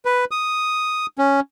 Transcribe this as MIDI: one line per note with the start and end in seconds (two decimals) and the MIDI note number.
0.05 0.25 71
0.31 1.06 87
1.18 1.40 61